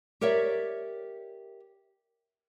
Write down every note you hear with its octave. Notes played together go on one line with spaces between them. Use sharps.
G4 A#4 C#5 D5 E5